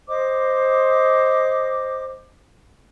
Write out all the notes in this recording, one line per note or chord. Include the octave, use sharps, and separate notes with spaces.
C5 D#5 D6